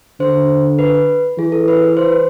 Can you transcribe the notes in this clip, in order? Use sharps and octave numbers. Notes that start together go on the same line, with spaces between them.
D3 C5
B4
E3 G#4
A4
B4
B4
C5